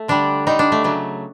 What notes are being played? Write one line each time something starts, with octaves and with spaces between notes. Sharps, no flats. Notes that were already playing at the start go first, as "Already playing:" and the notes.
Already playing: A3
D3 G3 D4
D3 G3 D#4
D4
A3
C#3 F#3 A3